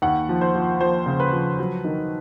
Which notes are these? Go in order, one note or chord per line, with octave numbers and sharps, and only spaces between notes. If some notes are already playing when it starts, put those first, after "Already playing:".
D#2 F#5
F3
C5
F3
F3 C5
C#3
B4
F3
F#3
D#3